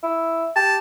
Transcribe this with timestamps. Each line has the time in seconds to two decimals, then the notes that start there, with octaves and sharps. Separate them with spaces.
0.03 E4
0.56 G4 A5